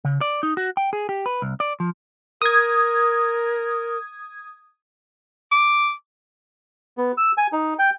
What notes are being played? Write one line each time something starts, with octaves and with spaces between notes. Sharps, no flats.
C#3
D5
D#4
F#4
G5
G#4
G4
B4
C2
D5
F3
A#4 D#6 G#6
D6
B3
E6
G#5
D#4
G5